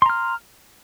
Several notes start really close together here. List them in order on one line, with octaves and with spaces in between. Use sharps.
C6 A#5 F6